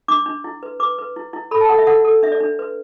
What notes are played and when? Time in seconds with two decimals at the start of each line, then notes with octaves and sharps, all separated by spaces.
0.08 D4 D6
0.26 D4
0.44 E4
0.63 B4
0.80 B4 D6
0.98 B4
1.16 E4
1.33 E4
1.51 A4 B5
1.61 A5
1.69 A4 F#5
1.78 E5
1.87 A4 F#5
2.04 A4
2.23 D4 E5
2.32 D5
2.40 D4
2.59 B4